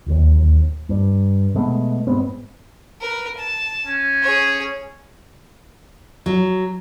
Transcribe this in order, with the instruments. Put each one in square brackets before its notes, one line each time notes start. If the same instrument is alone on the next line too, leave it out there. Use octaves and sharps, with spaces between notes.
[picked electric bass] D1 D#2
G2
B2 G#3 A3 B3
G#2 G#3 B3 C4
[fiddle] A#4 B4
A5
[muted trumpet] C#4
[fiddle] G#4 C#5
[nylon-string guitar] F#3